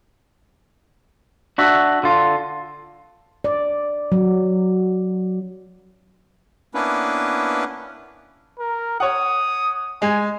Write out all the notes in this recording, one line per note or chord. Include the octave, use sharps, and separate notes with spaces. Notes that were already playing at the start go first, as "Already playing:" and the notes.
D4 F#4 E5
D3 F4
D5
F#3
A#3 B3 C#4 D4 E4 B4
A#4
C#5 F#5 D#6
G#3 G#5